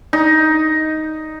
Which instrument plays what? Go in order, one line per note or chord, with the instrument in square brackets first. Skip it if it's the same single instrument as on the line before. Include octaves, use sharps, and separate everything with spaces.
[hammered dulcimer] D#4